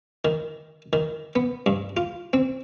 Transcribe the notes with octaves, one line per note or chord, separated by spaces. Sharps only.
D#3
D#3
B3
G2
F4
C4